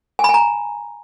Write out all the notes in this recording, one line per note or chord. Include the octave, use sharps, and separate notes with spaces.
G#5
B5
G#5
A#5